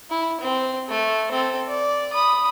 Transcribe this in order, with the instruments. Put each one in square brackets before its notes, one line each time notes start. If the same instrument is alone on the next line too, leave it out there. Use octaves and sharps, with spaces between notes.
[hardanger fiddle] E4
C4
A3
C4 A4
D5
B5 D#6